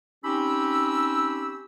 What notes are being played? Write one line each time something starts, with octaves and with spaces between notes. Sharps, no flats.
C4 C#4 D#4 G4 B5 E6